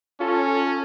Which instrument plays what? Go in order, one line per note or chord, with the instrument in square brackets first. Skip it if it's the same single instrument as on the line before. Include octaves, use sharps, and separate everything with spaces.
[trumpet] C#4 [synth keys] F4 A4